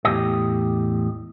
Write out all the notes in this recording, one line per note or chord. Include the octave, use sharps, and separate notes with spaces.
E2 A2 E3 G4 D#5